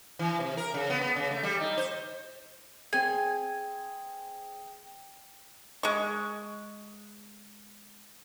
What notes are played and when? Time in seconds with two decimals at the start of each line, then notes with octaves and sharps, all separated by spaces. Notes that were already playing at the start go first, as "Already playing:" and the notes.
0.19 E3
0.40 C3
0.57 A#4
0.74 C#3
0.90 B3
1.01 B3
1.16 C#3
1.31 A3
1.43 G3
1.60 D#4
1.78 C5
2.93 C4 G#4 G5 G#5
5.83 G#3 C#6